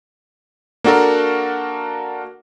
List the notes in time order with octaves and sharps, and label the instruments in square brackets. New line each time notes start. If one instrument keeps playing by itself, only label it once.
[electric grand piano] A#3 D4 F#4 A4 A#4